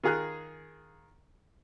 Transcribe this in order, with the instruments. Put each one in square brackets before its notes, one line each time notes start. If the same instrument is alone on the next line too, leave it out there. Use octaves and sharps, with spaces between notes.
[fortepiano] D#3 F4 G#4 A#4 F#6